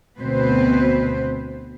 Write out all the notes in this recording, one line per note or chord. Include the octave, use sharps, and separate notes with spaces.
D2 B2 B3 C4 B4 C5